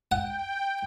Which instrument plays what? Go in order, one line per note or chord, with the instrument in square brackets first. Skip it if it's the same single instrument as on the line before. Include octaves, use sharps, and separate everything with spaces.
[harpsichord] F#5 [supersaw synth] G5